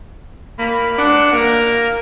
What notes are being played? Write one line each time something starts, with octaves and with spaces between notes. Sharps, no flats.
A#3 B5
D4 F#5
A#3 A#4